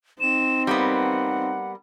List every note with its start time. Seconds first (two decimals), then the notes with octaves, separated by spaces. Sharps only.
0.21 C4 D#4 E7
0.67 G3 A#3 B3 F#5